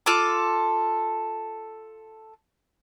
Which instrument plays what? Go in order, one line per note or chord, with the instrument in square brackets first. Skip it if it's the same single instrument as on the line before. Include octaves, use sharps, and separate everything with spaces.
[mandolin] F4 A4 D6